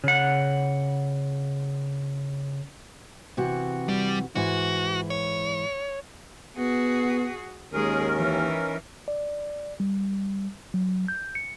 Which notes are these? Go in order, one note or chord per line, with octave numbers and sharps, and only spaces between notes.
C#3 F#5
C3 E3 F#4
G3
G#2 E3 E4 F#4
C#5
B3 F#4 G#4
D#2 D#3 G#3 C#4 G#4 A#4
E3
D5
G3
F#3
G6
C#7